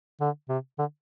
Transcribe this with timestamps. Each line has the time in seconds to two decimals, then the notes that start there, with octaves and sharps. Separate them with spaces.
0.20 D3
0.49 C3
0.78 D3